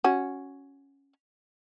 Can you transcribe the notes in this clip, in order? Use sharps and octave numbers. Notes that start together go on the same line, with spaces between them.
C#4 F#4